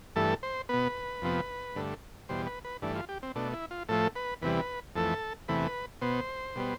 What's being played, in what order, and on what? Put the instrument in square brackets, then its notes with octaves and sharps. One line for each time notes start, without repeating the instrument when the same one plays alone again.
[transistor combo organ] G2 E3 A3 A4
C5
B2 B3 B4
F2 C3 F3 B3
G2 D3 A3
E2 B2 G3 C5
B4
B4
G2 E3 A3 D4
F4
G4
C4
B2 A3 D4
E4
F4
A2 F3 A3 A4
B4
E2 C3 E3 G3 B4
F2 E3 A3 A4
E2 C3 E3 A3 B4
B2 B3 C5
B2 G3 B3